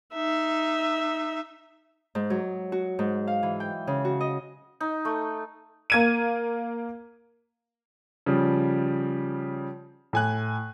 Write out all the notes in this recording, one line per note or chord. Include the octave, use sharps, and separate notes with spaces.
D#4 E5
G#2
F#3
F#4
G#2
F5
E3
G5
C#3
F#4
D#5
D#4
A3
A#3 G#6 D#7
C#3 F3 G3
A2 G#5 F#6